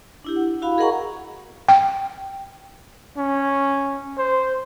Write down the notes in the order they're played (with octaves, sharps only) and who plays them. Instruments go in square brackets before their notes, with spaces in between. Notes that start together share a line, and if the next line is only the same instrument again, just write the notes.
[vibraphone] D4 E4 G4
F#5
E4 F#4 F5 B5
G#4 A#4 D#5 F#5 A#5 C#6
[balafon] G5
[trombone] C#4
C5